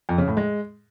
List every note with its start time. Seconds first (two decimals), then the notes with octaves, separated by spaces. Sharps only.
0.09 F2
0.18 C#3
0.28 A2
0.37 G#3